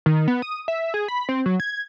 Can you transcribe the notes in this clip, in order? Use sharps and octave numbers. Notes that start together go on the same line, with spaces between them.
D#3
B3
D#6
E5
G#4
B5
C4
F#3
G#6